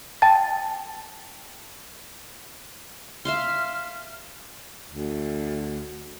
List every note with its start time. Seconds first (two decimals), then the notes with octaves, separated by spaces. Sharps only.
0.22 G5 A5 A6
3.25 E5 F5 C6 F6
4.91 D2